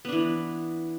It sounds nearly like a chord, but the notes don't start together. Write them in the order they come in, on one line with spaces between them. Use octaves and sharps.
B3 D4 E3